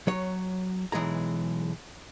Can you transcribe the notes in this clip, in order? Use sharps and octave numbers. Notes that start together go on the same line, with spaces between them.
F#3 C#5
B1 E3 G#3 G#4 A#5